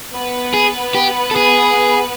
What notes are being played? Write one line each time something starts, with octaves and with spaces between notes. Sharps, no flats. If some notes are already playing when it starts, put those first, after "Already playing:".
B3 B4
G#4
G4
A4
G#4